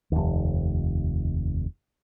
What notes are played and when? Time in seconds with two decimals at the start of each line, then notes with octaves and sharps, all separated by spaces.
0.12 F1 D#2